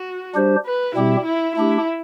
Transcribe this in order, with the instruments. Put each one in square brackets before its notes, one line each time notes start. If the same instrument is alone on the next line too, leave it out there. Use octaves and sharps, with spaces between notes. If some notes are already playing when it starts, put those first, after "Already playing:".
Already playing: [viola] F#4
[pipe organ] G3 D4 G4 C5
[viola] B4
[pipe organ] B2 G3 C4 G4 [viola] E4
[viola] E4
[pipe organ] A3 D4 G4 [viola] E4